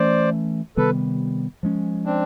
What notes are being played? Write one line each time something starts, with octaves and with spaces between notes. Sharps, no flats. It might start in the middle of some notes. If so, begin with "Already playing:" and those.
Already playing: E3 A3 C#4 C5 D5
C3 D#3 G3 B3 A4 B4
F3 G#3 C#4
C4 D4